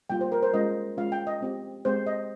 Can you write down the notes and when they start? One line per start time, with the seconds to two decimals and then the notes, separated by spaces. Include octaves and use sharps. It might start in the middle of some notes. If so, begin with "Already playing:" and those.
0.10 G3 A#3 F4 G5
0.21 C5
0.32 A#4
0.43 C5
0.53 G#3 C#4 F4 D#5
0.97 G#3 C#4 F4 F5
1.12 G5
1.27 D#5
1.41 G#3 C4 G4
1.85 G#3 C4 G4 C5
2.07 D#5